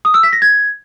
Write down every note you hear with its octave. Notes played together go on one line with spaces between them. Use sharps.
D#6
E6
B6
A#6
G#6